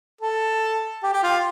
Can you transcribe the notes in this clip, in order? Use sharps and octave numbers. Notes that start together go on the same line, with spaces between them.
A4
G4
G4
F4